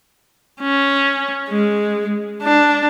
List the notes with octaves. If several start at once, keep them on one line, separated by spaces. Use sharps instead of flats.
C#4
G#3
D4